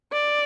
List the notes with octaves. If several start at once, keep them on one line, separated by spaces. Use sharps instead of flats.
D5